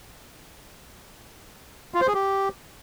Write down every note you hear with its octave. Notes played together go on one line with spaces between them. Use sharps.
F4
C5
G#4
G4